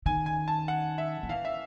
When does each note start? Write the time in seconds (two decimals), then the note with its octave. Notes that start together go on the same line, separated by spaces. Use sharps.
0.06 D#3 G#5
0.26 G#5
0.48 A5
0.68 F#5
0.98 E5
1.23 F3
1.29 E3 F5
1.45 E5